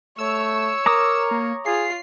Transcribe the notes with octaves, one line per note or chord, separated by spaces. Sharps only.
A3 C#5 E6
A#4 A#5 D6 D#6
A#3
F4 G#4 C7